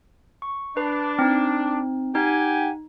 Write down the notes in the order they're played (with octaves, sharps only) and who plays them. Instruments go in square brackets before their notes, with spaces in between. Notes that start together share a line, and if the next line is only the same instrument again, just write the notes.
[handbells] C#6
[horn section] D4 [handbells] B4
[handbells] C4 D#4
[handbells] D#4 [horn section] G4 F#5 G#5